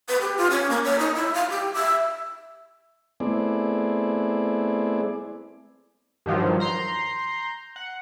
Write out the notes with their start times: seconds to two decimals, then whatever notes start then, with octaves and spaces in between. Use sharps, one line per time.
0.09 B4
0.21 G4
0.37 F4
0.50 C#4
0.70 A#3
0.84 C#5
0.99 D#4
1.15 E4
1.34 F5
1.50 G4
1.74 E5
3.20 A3 B3 C4 E4 G#4 D5
6.26 G2 D#3 F3 F#3
6.60 A#5 C6 G6
7.76 F#5